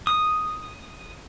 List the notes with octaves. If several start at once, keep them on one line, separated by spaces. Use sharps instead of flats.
D#6